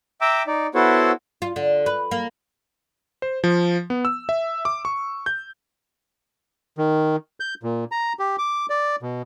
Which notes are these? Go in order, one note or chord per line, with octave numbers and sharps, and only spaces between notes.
E5 G5 A#5 D6 E6
D#4 D5
B3 E4 F#4 A4 C5 C#5
F4
D3
B4
A#3
C5
F3
B3
E6
E5
D6
C#6
G6
D#3
G6
A#2
A#5
G4
D6
D5
B2